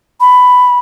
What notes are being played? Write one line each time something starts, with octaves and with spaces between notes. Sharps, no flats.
B5